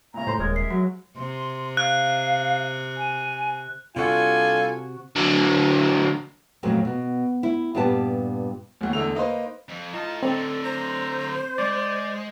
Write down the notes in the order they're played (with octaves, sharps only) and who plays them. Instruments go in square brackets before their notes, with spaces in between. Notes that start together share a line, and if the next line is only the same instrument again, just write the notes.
[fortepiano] A#2 C#3 [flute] A#5
[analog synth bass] A2 [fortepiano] C5 C6
[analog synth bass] D#1 [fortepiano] G#3 A#4 [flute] C#5
[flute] E5 [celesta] C7
[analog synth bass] F#3 [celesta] F#4
[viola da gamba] C3 [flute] C6
[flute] F5 [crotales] F#6
[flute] G#5
[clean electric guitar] C3 F#4 [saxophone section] G3 D4 A4 [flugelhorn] F4 [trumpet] G#5
[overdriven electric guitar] D3 F#3
[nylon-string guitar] F2 A#2 C#3 F#3 A3 C4
B2
E4
G2 A#2 B3 G4 A5
[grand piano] A1 D2
E2 D3 G#3 A3 E6 F7
A#3 D#4 B4 C5
[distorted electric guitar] F2
[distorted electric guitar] A2 A5 [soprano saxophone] D#4 [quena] F4
[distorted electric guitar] A2 D3 [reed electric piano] C4 [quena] A4
[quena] C5 [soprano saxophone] A#5
[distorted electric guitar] G#3 [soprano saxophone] D5